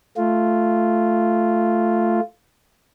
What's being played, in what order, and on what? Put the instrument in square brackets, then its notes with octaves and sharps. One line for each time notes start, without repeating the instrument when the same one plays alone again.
[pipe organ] A3 F4